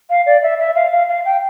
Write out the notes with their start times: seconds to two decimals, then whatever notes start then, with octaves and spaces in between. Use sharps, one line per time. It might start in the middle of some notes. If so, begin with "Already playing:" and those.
0.10 F5
0.26 D5
0.43 E5
0.59 E5
0.75 F5
0.92 F5
1.08 F5
1.25 G5